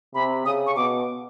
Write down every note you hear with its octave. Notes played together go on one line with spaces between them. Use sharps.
C3 B5
C#3 D#6
C#6
B2 D6